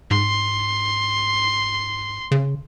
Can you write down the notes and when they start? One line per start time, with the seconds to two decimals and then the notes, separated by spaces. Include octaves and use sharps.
0.11 G#2 C6
2.31 C#3